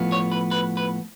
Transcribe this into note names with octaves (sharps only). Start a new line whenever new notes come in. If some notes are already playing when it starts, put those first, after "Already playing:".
Already playing: A2 F3 B3
C#5
B4
B4
B4